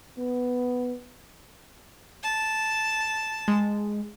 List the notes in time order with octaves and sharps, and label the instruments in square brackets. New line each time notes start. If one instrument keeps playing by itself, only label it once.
[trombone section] B3
[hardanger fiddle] A5
[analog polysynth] G#3